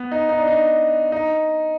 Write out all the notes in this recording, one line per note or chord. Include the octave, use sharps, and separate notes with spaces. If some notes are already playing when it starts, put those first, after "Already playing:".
Already playing: B3
D#4
D#4
D4
D#4
D#4